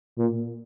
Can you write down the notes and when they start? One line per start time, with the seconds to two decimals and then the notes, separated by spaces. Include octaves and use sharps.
0.17 A#2